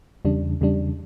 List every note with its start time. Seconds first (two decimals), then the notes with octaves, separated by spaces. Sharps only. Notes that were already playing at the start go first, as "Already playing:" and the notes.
0.25 E2 C#3 G3 D4
0.61 E2 C#3 G3 D4